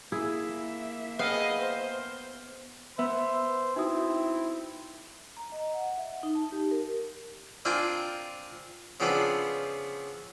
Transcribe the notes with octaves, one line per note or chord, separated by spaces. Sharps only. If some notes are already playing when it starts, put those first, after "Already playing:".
A#3 E4 G#4 E5
B3 G#4 D#5 F5 G5
C5
B3 C5 E5
C4 D#4 E4 F#4 D#6
A#5
D#5
F#5
E5
D#4
A5
G4
A#4
C4 D4 F4 A#4 G5 G#5
C#3 F3 B3 C4 D4 B4